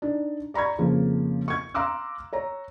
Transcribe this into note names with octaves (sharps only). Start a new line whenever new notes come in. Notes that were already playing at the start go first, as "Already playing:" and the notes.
D4 D#4
D5 A#5 B5 C#6 G#6
F2 C#3 F3 A#3
C#6 G#6
F5 A#5 C6 D6 E6 F#6
C#5 A#5